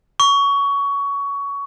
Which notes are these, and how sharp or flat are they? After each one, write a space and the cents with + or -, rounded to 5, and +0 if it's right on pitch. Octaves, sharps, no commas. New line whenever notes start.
C#6 +20